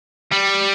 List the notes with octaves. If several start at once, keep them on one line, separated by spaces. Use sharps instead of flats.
G3